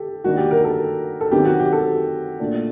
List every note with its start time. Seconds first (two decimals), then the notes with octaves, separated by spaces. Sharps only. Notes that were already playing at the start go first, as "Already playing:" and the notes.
Already playing: G4 A4
0.24 D#3 G3 A#3 D4 F#4
0.38 G4
0.51 A#4
0.64 A4
1.21 A4
1.32 D#3 F#3 C4 D#4 G4
1.45 F#4
1.59 G4
1.73 A4
2.40 A#2 A3 D4